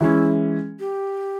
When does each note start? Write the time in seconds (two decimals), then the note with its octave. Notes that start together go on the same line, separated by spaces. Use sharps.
0.01 E3 G#3 C#4 E4
0.80 G4